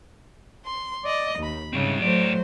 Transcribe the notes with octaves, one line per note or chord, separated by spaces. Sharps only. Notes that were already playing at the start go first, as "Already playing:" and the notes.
C6
D5 D#5
D#2 B5
G#2 C#3 G3 C4
A2 F#3 A3 C5 D5